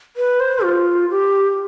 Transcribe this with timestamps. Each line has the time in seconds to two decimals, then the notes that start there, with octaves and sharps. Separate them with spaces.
0.17 B4
0.40 C5
0.64 F4
1.10 G4